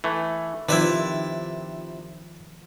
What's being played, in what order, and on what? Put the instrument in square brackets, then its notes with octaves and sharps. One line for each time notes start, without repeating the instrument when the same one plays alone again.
[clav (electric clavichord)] E3 A3
[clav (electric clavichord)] C3 E4 [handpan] D#3 F3 [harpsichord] B4 D5 E5